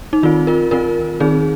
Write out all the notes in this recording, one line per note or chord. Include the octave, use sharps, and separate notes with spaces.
D#4
D#3 C4 F4
F4 A#4
D#3 C4 F4 A#4
D#3 C4 D#4 G#4